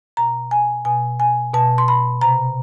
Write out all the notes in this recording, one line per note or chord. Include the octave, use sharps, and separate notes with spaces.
B2 A#5
G#5
B2 G#5
G#5
B2 A5
C6
B5
C3 A#5